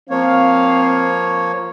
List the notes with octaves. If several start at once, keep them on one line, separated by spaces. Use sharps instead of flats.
F3 A#3 C4 C#5 F5